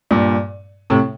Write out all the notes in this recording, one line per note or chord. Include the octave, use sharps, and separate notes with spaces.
G2 A#2
A2 C3